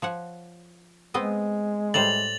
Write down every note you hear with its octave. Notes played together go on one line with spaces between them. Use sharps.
F3 C#5 F#5
G#3 B3 C4 D#5
A2 G3 C5 A6 F7 F#7